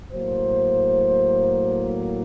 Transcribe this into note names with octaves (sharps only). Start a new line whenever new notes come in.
A2 F#3 A#3 C5